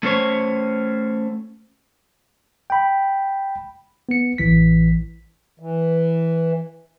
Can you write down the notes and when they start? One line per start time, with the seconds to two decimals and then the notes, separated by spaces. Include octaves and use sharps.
0.03 A3 C#4 C5 C#5
2.70 G5 B5
4.09 B3 C#7
4.38 A1 E3 B6
5.60 E3